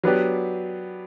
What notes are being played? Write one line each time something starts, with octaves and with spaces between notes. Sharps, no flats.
F#3 B3 D4 G4 B4